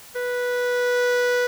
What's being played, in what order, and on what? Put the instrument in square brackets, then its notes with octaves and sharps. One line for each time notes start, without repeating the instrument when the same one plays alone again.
[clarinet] B4